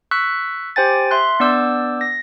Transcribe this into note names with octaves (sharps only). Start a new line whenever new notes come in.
C#6 E6 F#6 B6
G4 C5 G5 G#5 A6
E5 C6 F#6
B3 D4 D5 D6 E6 G6
A#6